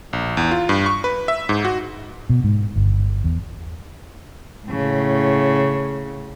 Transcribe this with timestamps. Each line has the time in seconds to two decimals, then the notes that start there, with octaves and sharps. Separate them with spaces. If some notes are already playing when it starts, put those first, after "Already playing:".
0.13 A#1
0.37 E2
0.51 F4
0.69 G2
0.86 C#6
1.04 B4
1.28 E5
1.49 G#2
1.65 F#4
2.29 B2
2.44 G#2
2.76 G1
3.24 E2
4.68 A2 C#3